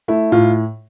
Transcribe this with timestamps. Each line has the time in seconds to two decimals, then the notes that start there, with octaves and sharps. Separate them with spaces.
0.08 A3 E4
0.32 A2 F4